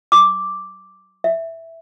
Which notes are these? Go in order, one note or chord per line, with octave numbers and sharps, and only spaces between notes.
D6
E5